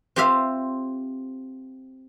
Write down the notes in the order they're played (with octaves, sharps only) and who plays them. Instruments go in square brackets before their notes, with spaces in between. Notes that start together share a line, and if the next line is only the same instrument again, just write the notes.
[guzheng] C4 F4 G4 C5 E5 F5